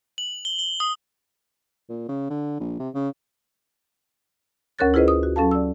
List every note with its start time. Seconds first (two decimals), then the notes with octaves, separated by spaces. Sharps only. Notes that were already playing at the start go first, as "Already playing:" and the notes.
0.18 F#7
0.45 G7
0.59 G7
0.80 D#6
1.90 A#2
2.09 C#3
2.30 D3
2.60 A#1
2.80 C3
2.95 C#3
4.79 D2 C#4 A#4 C#5 F#6 A6
4.94 E4 F4 G#4 B4 C5 D#5
5.08 D#6
5.23 F#4
5.36 F#3 C#4 A4 F5 A5
5.51 D5 E6